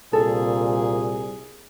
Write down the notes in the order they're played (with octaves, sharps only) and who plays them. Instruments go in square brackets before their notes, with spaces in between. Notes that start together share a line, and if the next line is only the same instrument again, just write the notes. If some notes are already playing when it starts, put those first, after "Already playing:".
[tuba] C2 [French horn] A#2 [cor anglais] G#4 [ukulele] A4